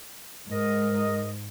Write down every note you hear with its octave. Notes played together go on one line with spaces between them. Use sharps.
G#2 A#4 D#5